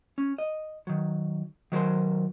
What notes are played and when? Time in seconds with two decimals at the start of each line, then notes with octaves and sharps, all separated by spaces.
0.18 C#4
0.38 D#5
0.87 D#3 F#3
1.72 D#3 F#3 A#4 C5